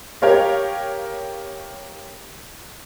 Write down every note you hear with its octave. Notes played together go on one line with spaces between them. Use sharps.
G4 A#4 C#5 F5